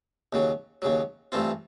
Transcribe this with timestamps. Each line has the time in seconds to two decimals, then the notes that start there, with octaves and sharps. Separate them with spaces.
0.33 D#2 C#3 F#3
0.82 D#2 C#3 F#3
1.32 G2 E3 A3 C4 F4